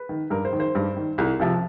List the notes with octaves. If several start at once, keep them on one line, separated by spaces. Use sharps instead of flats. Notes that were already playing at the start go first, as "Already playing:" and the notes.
Already playing: B4
D#3
G2 A#4
C5
D#3
C5
G2
D#3
C2
C3 F3